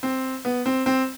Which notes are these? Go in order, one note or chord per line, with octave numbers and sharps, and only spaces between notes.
C4
B3
C4
C4